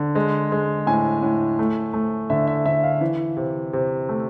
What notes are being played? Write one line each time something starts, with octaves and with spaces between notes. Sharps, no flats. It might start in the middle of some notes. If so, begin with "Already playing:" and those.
Already playing: D3
G#3
G#3
A2 G#5
A2
A3
A3
D3 E5
E5
D3 E5
F5
E3
C3
C3
A3